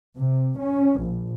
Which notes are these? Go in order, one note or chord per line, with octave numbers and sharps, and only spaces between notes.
C3
C#4
A#1